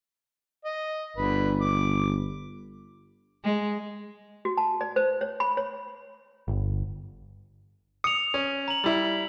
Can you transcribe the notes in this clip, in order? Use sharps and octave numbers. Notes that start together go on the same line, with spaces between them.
D#5
G1 D3 B4
D6
G#3
F#4
A5
D5
C5
C#5
B5
C#5
G1
D#6 C#7 F7
C#4
A#5 F#7
G3 E4